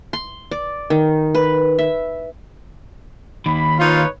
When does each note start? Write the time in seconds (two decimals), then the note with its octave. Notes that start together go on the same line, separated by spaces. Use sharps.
0.13 C6
0.51 D5
0.90 D#3
1.35 B4
1.79 E5
3.46 D#2 D#3 B5
3.79 D#4 F4 B4 C#5